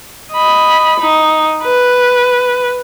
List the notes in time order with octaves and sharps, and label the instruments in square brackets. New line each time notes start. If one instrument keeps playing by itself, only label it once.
[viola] D#5 B5
D#4
B4